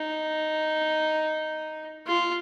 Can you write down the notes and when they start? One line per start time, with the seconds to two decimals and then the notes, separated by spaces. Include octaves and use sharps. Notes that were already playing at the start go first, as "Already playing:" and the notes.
Already playing: D#4
2.06 F4